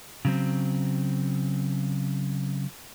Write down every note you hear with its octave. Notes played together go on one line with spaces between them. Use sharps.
C#3 F#3 C4